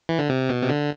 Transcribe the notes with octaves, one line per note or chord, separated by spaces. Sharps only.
E3
D3
C3
B2
C3
D3